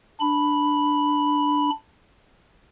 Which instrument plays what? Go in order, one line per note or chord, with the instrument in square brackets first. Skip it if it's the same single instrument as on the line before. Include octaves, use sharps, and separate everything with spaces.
[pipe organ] D4 B5